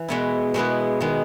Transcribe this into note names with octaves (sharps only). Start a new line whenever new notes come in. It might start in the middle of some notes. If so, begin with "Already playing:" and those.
Already playing: E3
B2 G#3 B3 E4
B2 G#3 B3 E4
D#3 G#3 B3